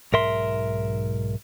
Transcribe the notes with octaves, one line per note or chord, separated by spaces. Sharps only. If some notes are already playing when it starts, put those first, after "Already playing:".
B1 G#2 A#4 E5 C6